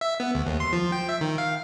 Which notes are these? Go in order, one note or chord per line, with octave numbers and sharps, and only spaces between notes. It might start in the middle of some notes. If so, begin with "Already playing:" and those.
E5
B3
D2
D#2
C6
F3
G5
E5
D#3
F5